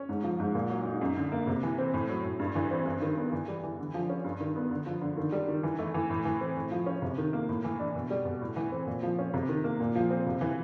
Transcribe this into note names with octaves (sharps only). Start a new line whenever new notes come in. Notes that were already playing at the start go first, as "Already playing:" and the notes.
Already playing: C#4
G#2
F3
G#2
A#2
F#3
D#4
F#2
D3
A#3
C3
E3
C4
A2
F#3
A2
G2
E3
C4
G2
D#3
B3
E3
G3
E3
D3
F3
C#4
G2
D#3
B3
D3
F3
D3
D#3
G3
D#3
E3
A3
E3
A2
E3
C4
A2
F3
C#4
C3
D#3
A#3
A2
E3
D4
B2
G3
B2
A2
E3
C4
A#2
F3
C#4
C3
D#3
A#3
A#2
F3
C4
C3
E3